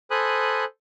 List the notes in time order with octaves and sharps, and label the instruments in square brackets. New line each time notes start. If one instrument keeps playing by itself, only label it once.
[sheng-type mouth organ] A4 C5 G#5 B5 D#6 F#6